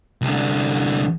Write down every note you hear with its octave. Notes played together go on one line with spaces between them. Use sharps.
C2 D3